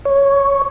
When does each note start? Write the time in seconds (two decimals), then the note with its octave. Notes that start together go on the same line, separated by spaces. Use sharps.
0.05 C#5